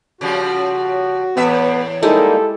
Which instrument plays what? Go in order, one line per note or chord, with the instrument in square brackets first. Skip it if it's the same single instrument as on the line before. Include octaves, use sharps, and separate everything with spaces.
[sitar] C#3 F3 G3 [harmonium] F#4
[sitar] E2 A2 E5 [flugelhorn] B3
[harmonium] G3 A#3 D#4 [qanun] G#3 E4 G4 [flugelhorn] A4